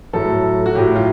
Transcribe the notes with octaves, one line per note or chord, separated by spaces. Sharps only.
A2 F#3 A4
F#4
A2 F#3 G4
F4